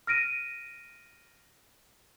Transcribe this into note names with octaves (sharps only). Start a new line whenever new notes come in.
F6 A#6 D7 D#7